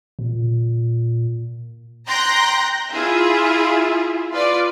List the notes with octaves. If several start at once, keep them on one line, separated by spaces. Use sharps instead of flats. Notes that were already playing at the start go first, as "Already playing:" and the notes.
A#2
G5 A#5 C6 F#6 G6 A#6
E4 F4 G#4 E5
F4 B4 D5